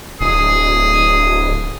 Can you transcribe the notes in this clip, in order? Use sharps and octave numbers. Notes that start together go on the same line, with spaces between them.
D1 G#4